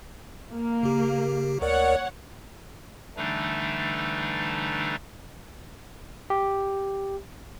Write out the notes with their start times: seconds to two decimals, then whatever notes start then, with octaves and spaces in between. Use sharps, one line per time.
0.52 A#3
0.83 C#3 G4
1.61 D2 A#4 C#5 D5 F#5
3.16 D3 E3 G3 A3 D4 D#4
6.30 G4